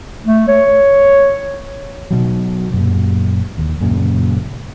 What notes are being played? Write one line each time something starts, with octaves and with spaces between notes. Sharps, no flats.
A3
C#5
B2 F#3
F#2 A#2
D#2
F#2 A#2 C#3